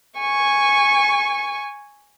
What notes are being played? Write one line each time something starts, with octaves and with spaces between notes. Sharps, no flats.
G#5 C#6